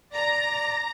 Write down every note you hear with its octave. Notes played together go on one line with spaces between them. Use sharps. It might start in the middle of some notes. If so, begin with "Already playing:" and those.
D5 A#5 A#6